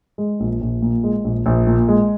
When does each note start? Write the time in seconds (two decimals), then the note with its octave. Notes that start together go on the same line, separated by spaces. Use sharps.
0.18 G#3
0.40 A#1
0.61 A#1
0.82 A#2
1.04 G#3
1.24 A#1
1.46 A#1
1.67 A#2
1.88 G#3